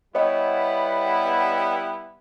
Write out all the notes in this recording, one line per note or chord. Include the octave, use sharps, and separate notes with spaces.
G3 B3 E4 C#5 D#5